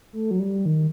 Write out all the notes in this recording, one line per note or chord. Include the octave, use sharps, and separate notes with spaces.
A3
F#3
G3
D#3